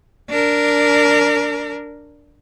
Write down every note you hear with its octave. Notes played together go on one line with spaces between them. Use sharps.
D4 A#4